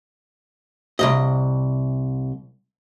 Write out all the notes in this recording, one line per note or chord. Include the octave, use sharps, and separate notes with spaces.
C2 F2 D#5